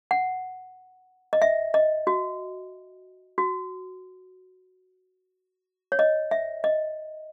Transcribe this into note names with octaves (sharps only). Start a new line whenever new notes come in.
F#5
D#5
E5
D#5
F#4
F#4
C#5
D#5
E5
D#5